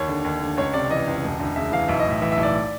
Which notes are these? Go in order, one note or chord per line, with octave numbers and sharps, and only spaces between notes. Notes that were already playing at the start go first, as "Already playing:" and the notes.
Already playing: D#2 C#5
D3
D#2
D3
C#2 C#5
C3 D5
E3 D#5
C#2
E1
D2
C#3 E5
E3 F5
B1 E5
D#5
A2
E5
E3 E5
E5
B1
D5